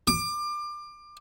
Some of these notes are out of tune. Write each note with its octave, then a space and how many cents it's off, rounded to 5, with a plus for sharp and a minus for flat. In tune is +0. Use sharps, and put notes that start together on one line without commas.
D6 +25